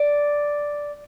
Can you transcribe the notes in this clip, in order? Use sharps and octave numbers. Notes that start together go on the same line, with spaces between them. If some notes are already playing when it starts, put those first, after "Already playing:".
Already playing: D5